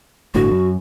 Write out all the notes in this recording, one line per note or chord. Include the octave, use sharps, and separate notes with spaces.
G1 A2 D3 F#4
F#2